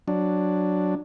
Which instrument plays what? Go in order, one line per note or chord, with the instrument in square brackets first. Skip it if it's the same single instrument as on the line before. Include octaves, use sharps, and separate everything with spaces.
[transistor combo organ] F#3 D4